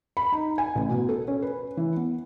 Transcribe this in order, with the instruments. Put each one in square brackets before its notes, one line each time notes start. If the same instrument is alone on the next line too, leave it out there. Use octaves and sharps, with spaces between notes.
[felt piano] B5
D#4
G#5
A1
B2
A4
C#4
B4
E3
B3